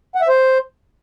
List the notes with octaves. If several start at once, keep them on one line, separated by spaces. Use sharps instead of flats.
F#5
E5
C5